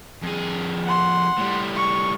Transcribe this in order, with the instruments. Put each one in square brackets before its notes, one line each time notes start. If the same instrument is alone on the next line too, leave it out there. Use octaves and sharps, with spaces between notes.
[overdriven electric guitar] F2 G#4
[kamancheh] F#5 C6
[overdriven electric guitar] A2 G3
[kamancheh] C#6